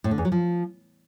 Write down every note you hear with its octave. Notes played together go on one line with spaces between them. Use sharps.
A2
D3
E2
F#3
F3